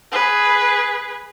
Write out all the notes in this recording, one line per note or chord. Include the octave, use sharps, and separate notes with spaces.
G#4 B4